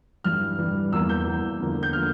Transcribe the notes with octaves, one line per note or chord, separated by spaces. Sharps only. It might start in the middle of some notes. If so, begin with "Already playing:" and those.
G2 E3 G3 F6
G2 E3 G3
E2 E3 A#3 E6
G6
E2 E3 A#3
E2 D3 F3 A#3
G6
D3 F3 A#3 F6